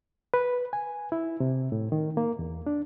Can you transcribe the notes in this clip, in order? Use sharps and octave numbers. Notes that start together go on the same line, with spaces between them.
B4
G#5
E4
C3
A2
D#3
A#3
E2
D4